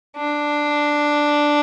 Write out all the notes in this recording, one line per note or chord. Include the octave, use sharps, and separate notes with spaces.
D4